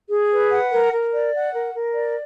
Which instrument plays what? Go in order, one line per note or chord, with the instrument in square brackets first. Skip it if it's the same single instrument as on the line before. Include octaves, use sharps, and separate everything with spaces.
[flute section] G#4
B4
F#5
A#4
A#4
D5
F#5
A#4
A#4
D5